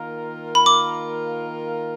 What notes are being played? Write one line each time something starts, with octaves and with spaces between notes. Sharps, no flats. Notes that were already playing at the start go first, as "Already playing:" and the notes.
Already playing: D#3 A#3 F4 A#4
B5
D6